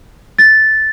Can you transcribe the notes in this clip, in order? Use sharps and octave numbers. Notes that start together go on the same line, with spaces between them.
A6